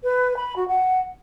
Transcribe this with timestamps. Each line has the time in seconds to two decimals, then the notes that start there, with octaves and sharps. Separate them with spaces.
0.03 B4
0.36 B5
0.56 F#4
0.68 F#5